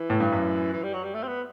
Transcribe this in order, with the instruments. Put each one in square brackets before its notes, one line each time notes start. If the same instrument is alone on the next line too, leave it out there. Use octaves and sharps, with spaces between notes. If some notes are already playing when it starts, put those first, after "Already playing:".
Already playing: [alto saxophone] E3
[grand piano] A2
G2
F#2
[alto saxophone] E3
G3
F#3
G3
A3
C4
B3